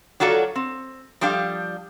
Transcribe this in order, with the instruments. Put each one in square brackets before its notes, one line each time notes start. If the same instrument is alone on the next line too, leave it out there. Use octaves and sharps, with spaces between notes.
[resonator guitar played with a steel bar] F#3 F4 F#4 A4 D5
C4
F3 G3 D4 G4 F5